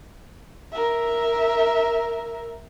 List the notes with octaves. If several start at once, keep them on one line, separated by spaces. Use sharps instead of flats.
A#4 E5